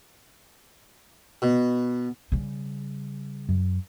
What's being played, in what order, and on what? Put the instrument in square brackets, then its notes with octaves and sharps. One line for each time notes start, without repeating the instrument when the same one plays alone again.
[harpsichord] B2
[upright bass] C#3 G3
[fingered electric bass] F#2